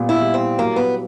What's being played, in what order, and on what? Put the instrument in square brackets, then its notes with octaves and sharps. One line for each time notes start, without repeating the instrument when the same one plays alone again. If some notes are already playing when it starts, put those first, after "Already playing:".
Already playing: [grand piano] A#2 G3 B3
[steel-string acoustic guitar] E4
[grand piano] G3
[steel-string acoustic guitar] C4
[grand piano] F#3 [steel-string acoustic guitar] A#3
[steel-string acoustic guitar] B3